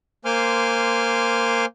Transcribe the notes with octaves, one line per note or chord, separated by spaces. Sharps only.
A#3 C5 G#5 C6 D6 F6